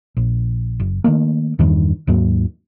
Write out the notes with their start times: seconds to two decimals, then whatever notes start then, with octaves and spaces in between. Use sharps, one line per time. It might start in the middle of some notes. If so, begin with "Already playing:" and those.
0.17 A#1
0.80 F#1
1.04 D#3 F3 A3 A#3
1.59 E2 G2 D#3
2.07 D#2 G#2 F#3 A#3